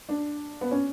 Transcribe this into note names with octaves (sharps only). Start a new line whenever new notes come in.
D4
B3
C#4